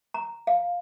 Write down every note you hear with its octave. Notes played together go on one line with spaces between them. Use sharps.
A#5
F5